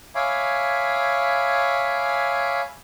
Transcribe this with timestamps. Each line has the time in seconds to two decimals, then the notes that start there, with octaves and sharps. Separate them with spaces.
0.15 C#5 E5 F5 G#5 B5 D6